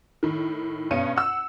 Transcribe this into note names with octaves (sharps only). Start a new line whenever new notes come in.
A2 D#3
G2 B2 C#4 C#7 D#7
F#5 E6